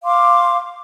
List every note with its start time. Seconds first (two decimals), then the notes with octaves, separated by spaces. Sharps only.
0.05 F5 C6 D6